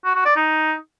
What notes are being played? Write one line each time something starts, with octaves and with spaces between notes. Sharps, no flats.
F#4
F#4
D5
D#4